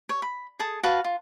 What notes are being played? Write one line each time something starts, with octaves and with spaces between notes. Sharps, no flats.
C#5
B5
G#4 A4 A5 D#6
F#4 B4 F5 A5
F4